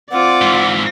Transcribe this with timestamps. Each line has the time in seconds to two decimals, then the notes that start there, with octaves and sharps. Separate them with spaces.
0.11 C4 F4 D5 F#5 D6
0.42 G#2 E3